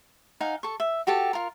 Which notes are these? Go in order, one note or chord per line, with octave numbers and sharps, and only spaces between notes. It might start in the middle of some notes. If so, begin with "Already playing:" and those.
D#4 F5 F#5 G#5
A4 C#6
E5
F#4 G4 A4 A5
F4 A#4